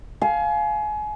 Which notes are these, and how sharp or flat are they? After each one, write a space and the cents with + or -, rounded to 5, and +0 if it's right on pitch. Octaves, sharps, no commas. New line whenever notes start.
F5 +0 G#5 +30